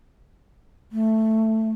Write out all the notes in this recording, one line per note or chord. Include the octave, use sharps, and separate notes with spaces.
A3